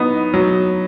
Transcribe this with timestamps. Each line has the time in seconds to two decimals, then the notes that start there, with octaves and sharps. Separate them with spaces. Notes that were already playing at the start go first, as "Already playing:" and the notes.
Already playing: F#3 B3 D#4
0.34 F#3